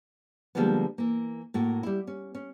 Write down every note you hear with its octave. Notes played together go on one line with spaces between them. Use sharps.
D3 F3 G3 G#3 A#3 B3
E3 A#3
A2 A#3 F#4
G3 E4
C#4
C#4